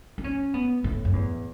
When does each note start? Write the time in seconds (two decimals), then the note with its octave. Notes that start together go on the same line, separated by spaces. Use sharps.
0.18 E4
0.24 C#4
0.54 B3
0.84 A2
1.05 F#2
1.13 E2